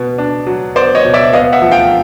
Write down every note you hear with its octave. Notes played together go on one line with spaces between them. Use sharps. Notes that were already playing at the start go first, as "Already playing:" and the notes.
Already playing: B2 B3
D4
F#3
B3 C5 D5
C#5 D#5
B2
D5 E5
B3 D#5 F5
E5 F#5
F3
F5 G5